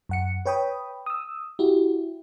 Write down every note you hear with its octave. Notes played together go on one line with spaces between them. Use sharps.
F#2 F#5 C#7
B4 C#5 G5 B5 D#6
D#6 E6
E4 F#4 G4